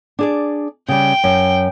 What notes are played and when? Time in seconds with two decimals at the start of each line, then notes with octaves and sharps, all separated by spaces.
0.19 D4 G#4 D5
0.88 C#3 G3 G5
1.24 F#2